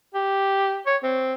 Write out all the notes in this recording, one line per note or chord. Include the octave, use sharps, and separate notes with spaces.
G4
C#5
C4